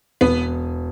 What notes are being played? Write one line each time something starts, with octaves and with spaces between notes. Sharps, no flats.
E1 B3